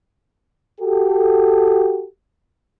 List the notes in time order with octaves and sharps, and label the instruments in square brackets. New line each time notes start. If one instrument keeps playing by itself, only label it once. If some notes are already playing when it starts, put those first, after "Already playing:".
[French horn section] F#4 G4 A4